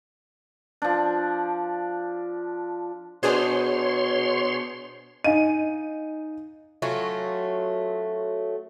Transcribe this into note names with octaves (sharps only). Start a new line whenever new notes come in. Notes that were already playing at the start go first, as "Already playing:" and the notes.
F3 D4
B2 D4 G#4 C5 C#5 C6
D#4 D#5 F5 G#5 D#7
F#3 A3 C#4 F4